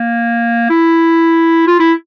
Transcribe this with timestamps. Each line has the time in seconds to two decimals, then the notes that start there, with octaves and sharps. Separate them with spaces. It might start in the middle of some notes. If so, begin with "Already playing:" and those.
Already playing: A#3
0.70 E4
1.67 F4
1.80 E4